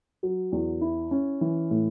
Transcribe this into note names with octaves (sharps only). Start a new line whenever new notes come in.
F#3
E2
E4
C#4
E3
A2